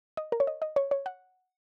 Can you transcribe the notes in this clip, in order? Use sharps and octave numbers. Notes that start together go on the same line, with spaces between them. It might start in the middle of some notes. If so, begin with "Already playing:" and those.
D#5
A#4
C#5
D#5
D#5
C#5
C#5
F#5